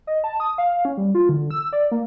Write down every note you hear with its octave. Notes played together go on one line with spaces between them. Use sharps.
D#5
A5
D#6
F5
C#4
G3
F4
D3
E6
D5
A#3